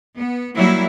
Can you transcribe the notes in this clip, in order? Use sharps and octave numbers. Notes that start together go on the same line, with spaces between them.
B3
F#3 G3 A#3 E4